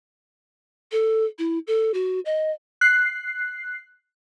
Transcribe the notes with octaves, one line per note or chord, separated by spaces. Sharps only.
A4
E4
A4
F#4
D#5
F#6 C7